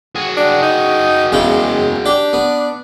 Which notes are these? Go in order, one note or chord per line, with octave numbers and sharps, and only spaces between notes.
F#4 G#4
D4
D#4
E2 C#3 G#3 G5
D4 G4
B3